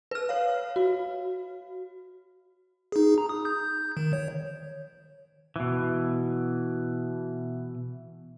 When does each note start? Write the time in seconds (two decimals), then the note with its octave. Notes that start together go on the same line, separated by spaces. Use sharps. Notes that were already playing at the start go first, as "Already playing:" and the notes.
0.11 B4 F6
0.29 C#5 F5
0.76 F#4
2.92 D#4 G#4
3.18 A#5
3.29 D#6
3.45 G6
3.97 D#3
4.13 C#5
5.56 B2 E3